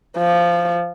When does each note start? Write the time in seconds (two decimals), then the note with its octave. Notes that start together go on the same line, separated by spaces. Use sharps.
0.18 F3